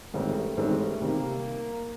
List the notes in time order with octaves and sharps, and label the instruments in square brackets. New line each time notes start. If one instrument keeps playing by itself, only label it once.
[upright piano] A1 G#2 D#3 G3 C4 [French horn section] A3
[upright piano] A1 G#2 D#3 G3 C4
[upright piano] C3 D#3 G3 [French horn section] A#3